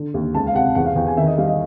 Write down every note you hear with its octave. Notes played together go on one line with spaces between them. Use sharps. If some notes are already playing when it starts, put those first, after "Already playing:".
Already playing: D3
D#2
C#2 A5
F5
C3 F#5
E2 F#5
F5
E2 G5
G#5
D#3 E5
D#5
G3 F5
D#5